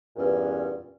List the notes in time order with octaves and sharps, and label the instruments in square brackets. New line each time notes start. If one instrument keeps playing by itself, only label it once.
[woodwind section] E2 G2 A#2 C#4